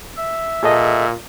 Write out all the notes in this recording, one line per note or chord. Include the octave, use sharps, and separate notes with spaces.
E5
A#2 G#4 A4 D#5